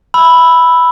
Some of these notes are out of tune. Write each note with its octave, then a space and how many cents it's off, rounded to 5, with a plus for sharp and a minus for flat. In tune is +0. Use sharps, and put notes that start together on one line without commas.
B5 +0 E6 +0